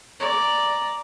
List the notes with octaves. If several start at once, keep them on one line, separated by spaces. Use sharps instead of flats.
D5 A#5